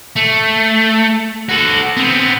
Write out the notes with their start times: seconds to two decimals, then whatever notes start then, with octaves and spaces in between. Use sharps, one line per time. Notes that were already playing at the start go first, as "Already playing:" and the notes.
0.16 A3
1.49 F#4 A4
1.97 B3 C4